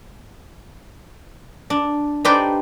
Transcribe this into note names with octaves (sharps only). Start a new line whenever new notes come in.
D4
D4 D#4 G4 B4 C5 D5